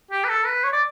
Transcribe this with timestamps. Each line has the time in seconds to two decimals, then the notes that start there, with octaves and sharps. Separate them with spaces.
0.11 G4
0.24 B4
0.29 A4
0.46 B4
0.63 C#5
0.73 D5